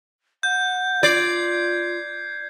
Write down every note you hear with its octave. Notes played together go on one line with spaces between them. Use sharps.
F#5 G6
F4 D5 G#6 C7